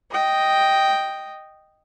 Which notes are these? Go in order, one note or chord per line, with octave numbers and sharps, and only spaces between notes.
D#5 G5